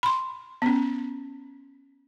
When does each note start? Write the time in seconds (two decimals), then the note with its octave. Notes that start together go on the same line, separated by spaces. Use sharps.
0.03 B5 C6
0.62 B3 C#4